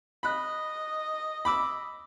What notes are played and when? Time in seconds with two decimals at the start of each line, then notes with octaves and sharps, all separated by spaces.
0.23 D#5 B5 F#6
1.45 B5 D6 E6